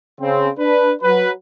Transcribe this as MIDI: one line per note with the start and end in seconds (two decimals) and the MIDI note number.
0.21 0.49 49
0.21 0.49 60
0.59 0.92 62
0.59 0.92 71
1.02 1.30 54
1.02 1.30 71